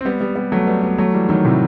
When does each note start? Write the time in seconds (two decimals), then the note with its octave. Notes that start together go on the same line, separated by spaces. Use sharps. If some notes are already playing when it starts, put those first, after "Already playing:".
0.01 C4
0.05 G3 B3
0.21 G3 B3
0.35 G3 B3
0.52 F#3 A3
0.67 G3 B3
0.83 G3 B3
0.98 F#3 A3
1.14 E3 G3
1.29 D#3 F#3
1.45 A2 C3